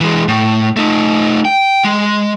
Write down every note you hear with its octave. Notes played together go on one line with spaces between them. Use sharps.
E3 G#3
A2
A3 D#4
G5
G#3